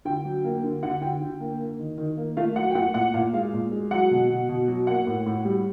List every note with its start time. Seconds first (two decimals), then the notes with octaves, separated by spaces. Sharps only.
0.05 D3 G5
0.25 F#3
0.44 A#3
0.64 D3
0.83 D3 F#5
1.02 D3 G5
1.22 D3
1.40 A#3
1.60 A#3
1.79 D#3
1.98 D#3
2.17 A#3
2.37 A3 F5
2.56 F#3 F#5
2.71 G5
2.75 A3 F#5
2.94 A#2 F#5
3.14 A#2 F5
3.33 G#3 F5
3.53 A#2
3.72 G#3
3.91 F#3 F#5
4.11 B2
4.30 B2
4.49 B2
4.68 F#3
4.87 A#3 F#5
5.07 A2
5.26 A2
5.45 G3